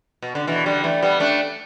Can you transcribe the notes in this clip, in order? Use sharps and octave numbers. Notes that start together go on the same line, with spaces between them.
B2
D3
B2 E3
D3 G3
E3 A3
G3 B3
A3 D4